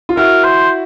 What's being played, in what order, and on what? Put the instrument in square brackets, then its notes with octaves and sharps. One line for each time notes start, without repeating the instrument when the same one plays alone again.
[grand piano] F4
[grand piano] E4 F#4 [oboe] A#4
[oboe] C5